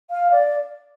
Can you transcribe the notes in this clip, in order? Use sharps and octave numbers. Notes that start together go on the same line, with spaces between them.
F5
D5